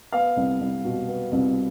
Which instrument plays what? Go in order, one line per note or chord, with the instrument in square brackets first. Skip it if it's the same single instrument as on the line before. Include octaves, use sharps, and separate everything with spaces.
[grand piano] B3 F5
C2
C2
B2
B3
C2